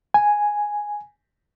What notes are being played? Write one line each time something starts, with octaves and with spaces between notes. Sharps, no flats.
G#5